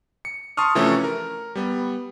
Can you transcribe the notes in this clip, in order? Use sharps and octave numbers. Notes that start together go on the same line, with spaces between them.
C#7
A5 C6 C#6 D#6 F6
C3 E3 F3 A3 C#4
A#4
G3 B3